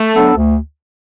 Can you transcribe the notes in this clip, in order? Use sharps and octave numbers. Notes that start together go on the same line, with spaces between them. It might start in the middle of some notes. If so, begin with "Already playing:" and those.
Already playing: A3
F#3 B3 D4 A4
D2